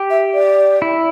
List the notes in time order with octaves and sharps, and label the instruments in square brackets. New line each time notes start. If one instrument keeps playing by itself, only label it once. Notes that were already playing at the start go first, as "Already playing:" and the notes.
Already playing: [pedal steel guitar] G4
[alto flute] E5
D5
[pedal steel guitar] E4